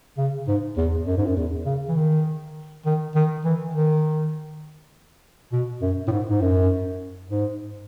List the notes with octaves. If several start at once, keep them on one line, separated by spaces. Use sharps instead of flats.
C#3
G#2
E2
F#2
G#2
F#2
E2
C#3
E3
D#3
D#3
D#3
E3
D#3
B2
F#2
A2
G#2
G#2
F#2
G#2